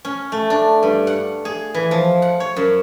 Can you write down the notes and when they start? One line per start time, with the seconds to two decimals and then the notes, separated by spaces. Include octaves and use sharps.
0.05 C#4
0.32 A3
0.50 D4
0.83 G2
1.07 F#5
1.45 G#4
1.74 E3
1.91 F3
2.22 F#5
2.40 C#5
2.56 F#2